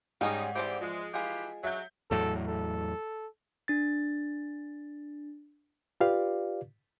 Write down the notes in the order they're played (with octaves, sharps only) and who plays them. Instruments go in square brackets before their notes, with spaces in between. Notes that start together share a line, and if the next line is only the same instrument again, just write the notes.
[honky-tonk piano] G#2 [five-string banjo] G3 C#4 G#4 [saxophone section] D#4
[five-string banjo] E3 C5 D5 [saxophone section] G3 C4 G4
[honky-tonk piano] F3 [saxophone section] G#3
[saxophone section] E3 F4 G4 [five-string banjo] G#3 G#4
[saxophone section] F#3 [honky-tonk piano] E5 G6
[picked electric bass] E2 A2 F#3 [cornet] A4
[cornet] A4
[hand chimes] D4 A6
[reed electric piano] F4 G4 B4 D5 F5